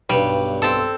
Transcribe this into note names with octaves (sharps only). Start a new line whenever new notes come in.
B1 G2 G3
C4 A4